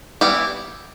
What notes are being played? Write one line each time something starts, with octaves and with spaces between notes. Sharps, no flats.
E3 G3 B3 E4 G4